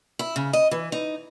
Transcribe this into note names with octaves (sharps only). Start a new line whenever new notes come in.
E4
C#3
D#5
E3
D#4